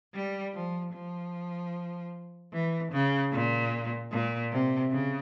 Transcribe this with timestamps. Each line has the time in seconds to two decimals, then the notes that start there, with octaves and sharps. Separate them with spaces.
0.14 G3
0.54 F3
0.94 F3
2.53 E3
2.92 C#3
3.33 A#2
4.12 A#2
4.52 C3
4.91 C#3